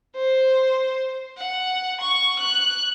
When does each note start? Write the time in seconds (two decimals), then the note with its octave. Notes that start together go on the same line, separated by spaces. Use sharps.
0.16 C5
1.38 F#5
2.01 C#6
2.39 F#6